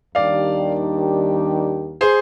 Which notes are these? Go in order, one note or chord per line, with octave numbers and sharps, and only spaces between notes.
D#2 D#3 G3 D4 G4 D5 F5
G#4 C5